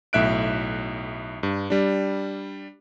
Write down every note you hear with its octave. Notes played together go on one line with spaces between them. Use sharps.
B1 A2 E5 F#6 D7
G2
G3 D4